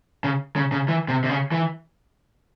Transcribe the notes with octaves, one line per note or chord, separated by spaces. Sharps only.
C#3
C#3
C#3
E3
C3
C3
C#3
E3